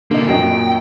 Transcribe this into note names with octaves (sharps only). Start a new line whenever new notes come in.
B2 D3 A#3 D#4
F#2 A#2 F#3 D#5 G5